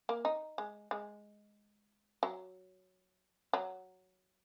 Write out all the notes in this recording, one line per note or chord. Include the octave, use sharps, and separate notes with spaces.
A#3
D#4
G#3
G#3
F#3
F#3